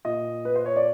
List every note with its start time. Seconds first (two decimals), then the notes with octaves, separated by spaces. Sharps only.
0.05 A#2 D#5
0.45 B4
0.55 C5
0.66 C#5
0.76 D5